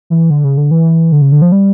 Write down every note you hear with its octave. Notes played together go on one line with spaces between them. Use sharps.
E3
D3
C#3
D3
E3
D3
C#3
D3
F3
G3